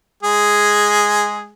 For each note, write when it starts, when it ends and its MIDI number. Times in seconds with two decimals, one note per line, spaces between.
0.23 1.50 56
0.23 1.50 68